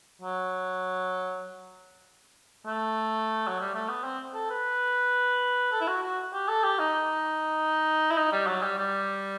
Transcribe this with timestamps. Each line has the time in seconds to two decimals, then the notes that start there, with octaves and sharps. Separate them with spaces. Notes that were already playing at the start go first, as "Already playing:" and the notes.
0.21 F#3
2.66 A3
3.47 F#3
3.60 G3
3.75 A3
3.88 B3
4.04 C4
4.34 A4
4.50 B4
5.72 A4
5.81 E4
5.88 F#4
6.03 F#4
6.33 G4
6.48 A4
6.64 G4
6.79 D#4
8.11 E4
8.17 D#4
8.32 G3
8.47 F#3
8.62 G3
8.78 G3